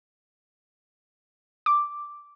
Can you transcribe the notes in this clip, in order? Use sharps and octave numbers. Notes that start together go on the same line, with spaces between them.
D6